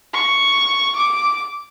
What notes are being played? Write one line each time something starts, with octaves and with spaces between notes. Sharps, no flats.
C#6
D6